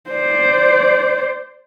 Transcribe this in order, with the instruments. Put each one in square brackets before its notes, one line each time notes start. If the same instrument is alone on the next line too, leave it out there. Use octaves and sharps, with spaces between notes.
[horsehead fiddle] C5 D5